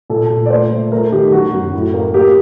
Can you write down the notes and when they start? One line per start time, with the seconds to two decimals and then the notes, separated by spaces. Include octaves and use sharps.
0.10 A#2 A4
0.30 A#2
0.46 D5
0.50 A3 C5
0.71 A3
0.92 A3 A#4
1.12 D#3 G4
1.32 F#3 F#4
1.53 F#2
1.73 A2
1.94 A#3
2.14 A#3 G4